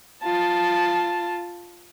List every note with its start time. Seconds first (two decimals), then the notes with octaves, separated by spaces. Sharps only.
0.24 F4 A5